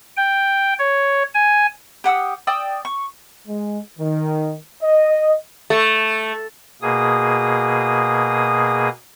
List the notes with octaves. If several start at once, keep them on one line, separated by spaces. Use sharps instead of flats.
G5
C#5
G#5
G4 F#5 D#6 E6
D5 G5 D#6 E6
C#6
G#3
D#3
D#5
A3
B2 A#3 G#4 D#6